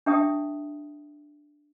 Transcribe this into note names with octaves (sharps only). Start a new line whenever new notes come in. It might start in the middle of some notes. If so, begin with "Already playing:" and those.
D4 G4 E5 G5 A5 D#6